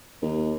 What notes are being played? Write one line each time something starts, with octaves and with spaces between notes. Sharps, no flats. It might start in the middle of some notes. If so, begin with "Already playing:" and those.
D#2